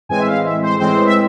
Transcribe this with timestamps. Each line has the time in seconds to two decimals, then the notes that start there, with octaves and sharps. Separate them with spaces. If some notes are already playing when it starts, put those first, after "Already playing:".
0.09 A2 E3 G#3 C4 G#5
0.19 E5
0.27 F5
0.44 E5
0.62 C5
0.79 A2 E3 G#3 C4 C5
1.06 E5